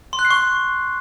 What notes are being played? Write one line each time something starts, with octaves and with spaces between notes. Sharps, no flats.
C6
F#6
C7
C#6